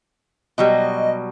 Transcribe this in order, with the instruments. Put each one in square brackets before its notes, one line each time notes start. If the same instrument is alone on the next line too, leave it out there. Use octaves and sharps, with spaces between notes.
[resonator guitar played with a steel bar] B2 F#3 G3 [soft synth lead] D#5